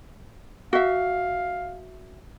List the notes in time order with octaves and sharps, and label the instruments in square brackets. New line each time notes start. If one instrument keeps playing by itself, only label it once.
[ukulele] F#4 E5 [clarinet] F5